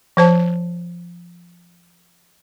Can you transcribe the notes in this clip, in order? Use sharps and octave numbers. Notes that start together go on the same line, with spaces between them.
F3 C5 A5